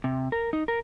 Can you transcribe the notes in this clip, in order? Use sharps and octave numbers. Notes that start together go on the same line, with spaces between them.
C3
A#4
D#4
A#4